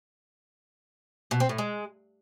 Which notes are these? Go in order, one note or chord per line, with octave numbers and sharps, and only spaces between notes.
B2
C4
A2
G#3